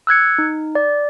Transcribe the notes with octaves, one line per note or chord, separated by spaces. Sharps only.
E6 F#6 G#6 C#7
D#4
D5